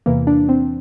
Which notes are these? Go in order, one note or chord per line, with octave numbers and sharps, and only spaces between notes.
E2 C3 E3 A#3
D4
C4